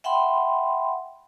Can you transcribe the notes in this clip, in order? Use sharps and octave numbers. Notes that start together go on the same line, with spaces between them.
E5 F#5 G5 B5 C6